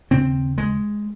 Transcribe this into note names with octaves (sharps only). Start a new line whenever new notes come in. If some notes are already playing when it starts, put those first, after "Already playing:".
D#2 C#3 C4
G#3